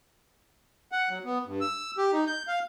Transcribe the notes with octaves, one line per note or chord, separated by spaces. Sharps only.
F#5
F#3
B3
G2
E6
G4
D#4
G6
F5